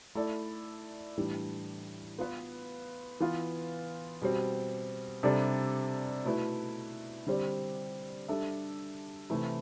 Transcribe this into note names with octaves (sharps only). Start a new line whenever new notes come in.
A3 E4 A4 D5
A2 E3 G3 D4
B3 F4 B4
E3 B3 F4
B2 G3 C4
C3 G3 D4 A4 D5
B2 A3 E4 B4
D3 G3 C4 G4 D5
G3 D4 A4 E5
C3 E3 A3 E4